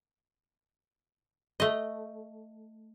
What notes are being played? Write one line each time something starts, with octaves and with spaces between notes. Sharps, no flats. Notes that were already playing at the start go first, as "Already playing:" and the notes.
A3 D#5